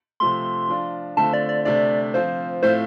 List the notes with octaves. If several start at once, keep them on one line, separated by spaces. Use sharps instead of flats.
C3 F3 A3 C6
F3 D4 F4
D3 A3 C4 F4 A5
D5
D5
C3 A3 D4 D5
F3 C4 F4 C5
A2 A3 C4 F4 C5